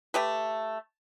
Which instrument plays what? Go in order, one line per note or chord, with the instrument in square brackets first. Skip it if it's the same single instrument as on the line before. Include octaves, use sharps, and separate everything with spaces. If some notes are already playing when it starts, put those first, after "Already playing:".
[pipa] A3 G4 B4